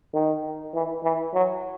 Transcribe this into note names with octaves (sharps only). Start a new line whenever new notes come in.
D#3
E3
E3
F#3